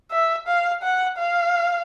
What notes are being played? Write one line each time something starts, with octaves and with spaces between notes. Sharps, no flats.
E5
F5
F#5
F5